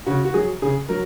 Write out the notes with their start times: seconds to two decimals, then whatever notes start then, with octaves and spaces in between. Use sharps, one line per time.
0.06 C#3 F#4
0.25 F#4
0.34 F#3 G#4
0.62 C#3 G#4
0.89 F#3 A#4